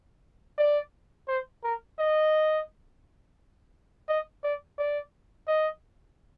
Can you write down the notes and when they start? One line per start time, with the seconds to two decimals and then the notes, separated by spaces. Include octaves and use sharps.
0.58 D5
1.28 C5
1.63 A#4
1.99 D#5
4.09 D#5
4.43 D5
4.78 D5
5.48 D#5